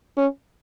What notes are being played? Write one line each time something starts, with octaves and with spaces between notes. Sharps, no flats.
C#4